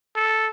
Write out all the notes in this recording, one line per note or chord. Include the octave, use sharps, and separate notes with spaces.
A4